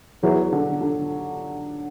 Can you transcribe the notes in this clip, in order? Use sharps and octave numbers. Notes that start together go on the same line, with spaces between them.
E2 F#3
D3
D3